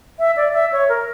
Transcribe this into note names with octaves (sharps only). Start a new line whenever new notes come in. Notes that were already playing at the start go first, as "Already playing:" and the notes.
E5
D5
E5
C#5
A#4